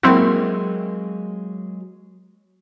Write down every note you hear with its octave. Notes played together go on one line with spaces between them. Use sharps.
F#3 G#3 A#3 C4 E4 F#4